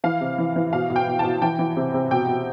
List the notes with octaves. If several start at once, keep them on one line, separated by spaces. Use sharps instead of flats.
E3 F5
C3
E3
E3
B2 F5
B2
G5
B2
B2 A5
E3 G5
E3
C3
C3
B2 G5
B2